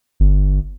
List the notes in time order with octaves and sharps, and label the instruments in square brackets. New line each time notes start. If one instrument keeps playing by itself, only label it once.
[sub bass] G1